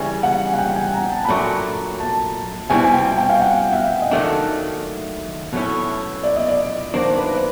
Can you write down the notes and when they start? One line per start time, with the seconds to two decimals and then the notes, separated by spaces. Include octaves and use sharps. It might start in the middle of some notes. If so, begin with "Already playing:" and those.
Already playing: C#3 E3 G3 G#5
0.23 F#5
0.54 F#5
0.58 G5
0.76 G#5
0.94 A#5
1.12 A5
1.25 B5
1.28 A#2 F#3 A3 D4 A#5
2.00 A5
2.70 B2 G3 C4 E4 G#5
2.84 G#5
2.93 G5
3.18 G5
3.29 F5
3.41 F#5
3.73 E5
3.76 F5
4.02 D#5
4.11 D#3 F#3 A3 D4 E5
5.53 B2 F#3 A3 C#4 E4
6.24 D5
6.36 D#5
6.49 D5
6.94 D#3 F#3 A#3 D4 C5
7.18 B4
7.25 C5
7.34 B4